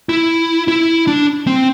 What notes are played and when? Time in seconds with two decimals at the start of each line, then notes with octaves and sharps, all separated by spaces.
0.09 E4
0.68 E4
1.07 D4
1.47 C4